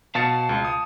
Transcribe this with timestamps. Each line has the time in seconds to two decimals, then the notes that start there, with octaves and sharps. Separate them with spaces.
0.15 B2 F5 A5 A6 C#7
0.49 C#2
0.65 D#6